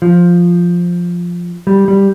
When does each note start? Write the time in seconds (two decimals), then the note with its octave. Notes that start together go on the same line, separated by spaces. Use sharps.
0.02 F3
1.67 G3
1.88 G3